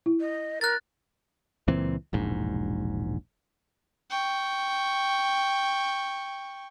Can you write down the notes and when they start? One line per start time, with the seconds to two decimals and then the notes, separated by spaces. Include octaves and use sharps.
0.06 E4
0.21 D#5
0.61 A#4 F#6 A6
1.68 C#2 A#2 E3 C4
2.13 E1 A#1 G#2
4.10 G5 C#6